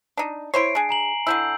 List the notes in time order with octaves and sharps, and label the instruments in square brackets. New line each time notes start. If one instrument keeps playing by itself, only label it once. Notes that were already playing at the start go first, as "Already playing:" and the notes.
[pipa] D4 D#4
[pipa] E4 C5 C#5 [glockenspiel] C7 D7
[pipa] D4 G#4
[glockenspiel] G#5 A#5 F#7
[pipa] D3 D4 E4 [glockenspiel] E6 G6